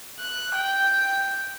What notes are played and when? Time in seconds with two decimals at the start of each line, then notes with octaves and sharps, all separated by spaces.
0.19 F#6
0.54 G5